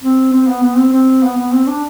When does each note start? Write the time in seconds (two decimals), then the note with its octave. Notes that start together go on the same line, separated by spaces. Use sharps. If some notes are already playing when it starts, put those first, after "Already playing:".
0.03 C4
0.33 C4
0.48 B3
0.63 B3
0.77 C4
0.93 C4
1.23 B3
1.38 B3
1.53 C4
1.68 D4